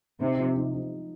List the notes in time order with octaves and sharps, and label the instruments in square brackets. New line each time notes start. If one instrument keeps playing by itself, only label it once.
[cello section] C3 [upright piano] D#4
[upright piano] F3
D#4
D#4